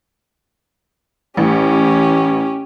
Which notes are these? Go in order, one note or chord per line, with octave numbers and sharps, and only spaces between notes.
A1 C#4 G4